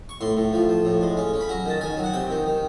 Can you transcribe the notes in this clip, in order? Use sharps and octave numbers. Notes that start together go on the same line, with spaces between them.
C#6
A2 C6
A2
F3
F3
A2
G#3
C#4
C#4
B5
F#3 A#5
D#3 A5
D#3 G#5
F#3
F#5
C3 G5
D#3
D#3